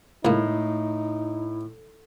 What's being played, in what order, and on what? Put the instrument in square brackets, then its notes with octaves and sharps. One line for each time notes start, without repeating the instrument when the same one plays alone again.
[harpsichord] C#2 A#3 [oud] A2 [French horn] D#4 [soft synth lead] E4